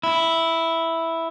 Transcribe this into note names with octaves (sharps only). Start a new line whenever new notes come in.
E4